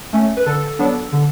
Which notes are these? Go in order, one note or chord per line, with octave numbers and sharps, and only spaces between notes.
A3 C#4
B4
D3 A4
F#3 B3 D4
D3